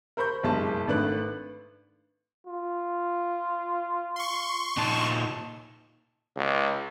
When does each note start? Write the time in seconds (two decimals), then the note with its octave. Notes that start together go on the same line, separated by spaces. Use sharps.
0.17 A#4 C5 B5 C#6 G6
0.43 F#1 B1 G2 G#3 A5
0.87 G#1 A3 D4 B4 F#6 F#7
2.47 F4
4.16 C6 C#6
4.77 A#2 D#4 A5
6.36 C#2